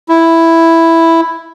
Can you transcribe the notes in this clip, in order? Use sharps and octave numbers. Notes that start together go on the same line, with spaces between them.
E4